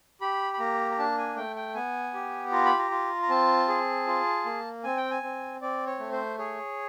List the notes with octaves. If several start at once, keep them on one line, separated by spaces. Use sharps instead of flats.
G4 B5
B5
A#3 A#5
A#5
D4 A5
G#5
A3 G5
G5
B3 G#5
G4
F4 A#5
B5
A#5
F4
A#5
C4 A5
G#4
F4
A#3
C4 G#5
G5
G#5
C4
C4 D5
C#5
A3
C5
G#4 C#5